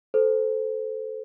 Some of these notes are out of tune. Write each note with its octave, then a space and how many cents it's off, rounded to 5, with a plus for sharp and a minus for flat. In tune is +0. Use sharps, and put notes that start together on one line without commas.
A4 -5 C5 -15